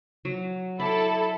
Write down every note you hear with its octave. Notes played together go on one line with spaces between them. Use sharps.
F#3
E4 A4 D5 B5